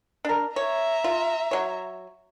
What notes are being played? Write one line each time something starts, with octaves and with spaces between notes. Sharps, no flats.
D4 A#4
C#5 E5 A#5
F4
F#3 C#5